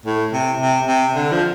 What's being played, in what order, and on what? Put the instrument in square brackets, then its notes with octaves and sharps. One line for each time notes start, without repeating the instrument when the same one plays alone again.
[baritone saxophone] A2
C3
C3
C3
D3
F3